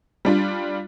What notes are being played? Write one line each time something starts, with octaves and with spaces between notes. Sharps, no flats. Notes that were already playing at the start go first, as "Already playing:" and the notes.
G3 D4 F4